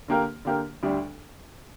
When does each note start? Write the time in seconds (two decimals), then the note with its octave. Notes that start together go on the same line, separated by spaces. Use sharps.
0.08 D3 A#3 G4 A#4
0.45 D3 A#3 G4 A#4
0.83 D2 D3 G3 D4